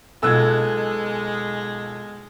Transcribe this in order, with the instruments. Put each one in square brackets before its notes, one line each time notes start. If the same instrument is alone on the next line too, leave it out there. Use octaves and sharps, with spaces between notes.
[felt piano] B1 B2 [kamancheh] G#3 [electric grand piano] F4 A4 [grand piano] E6 F#6 G#6